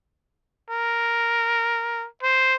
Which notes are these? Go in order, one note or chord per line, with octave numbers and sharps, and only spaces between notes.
A#4
C5